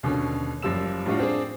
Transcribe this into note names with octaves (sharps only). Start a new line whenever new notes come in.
D#2 B2 D3 C#4
F#1 F3 G3 E6 E7
A2 G3 D4 F4 F#4
C4 D4 G#4 C5